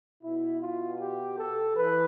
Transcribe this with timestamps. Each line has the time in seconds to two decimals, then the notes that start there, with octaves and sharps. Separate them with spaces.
0.23 B2 E4
0.61 F4
1.00 G4
1.39 A4
1.76 E3 B4